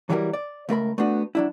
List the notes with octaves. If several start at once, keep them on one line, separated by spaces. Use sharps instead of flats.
E3 F#3 G3 E4 G4 A#4
D5
C#2 A3 A#4 B5
A3 B3 D4 F#4
F#3 D4 E4